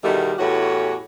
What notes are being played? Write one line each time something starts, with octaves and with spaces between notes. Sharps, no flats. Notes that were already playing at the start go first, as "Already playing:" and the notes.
E2 B2 D#3 G3 A4 E5
E2 A2 E3 F#4 G4 C#5